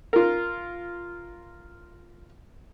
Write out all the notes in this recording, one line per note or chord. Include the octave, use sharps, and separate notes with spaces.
F4 A#4